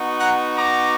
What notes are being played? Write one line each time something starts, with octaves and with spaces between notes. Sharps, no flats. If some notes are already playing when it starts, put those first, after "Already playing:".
Already playing: B3 D#4 F#4
F#5 A#5
A#5 D6